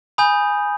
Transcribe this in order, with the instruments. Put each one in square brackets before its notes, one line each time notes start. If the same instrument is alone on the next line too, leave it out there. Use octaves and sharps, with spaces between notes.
[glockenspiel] G#5 B5 D#6 G6